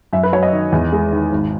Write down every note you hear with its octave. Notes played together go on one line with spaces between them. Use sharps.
F#2 E5
B4
F#3 C#5
D#5
D#3
E2
G#3
D#3
G#1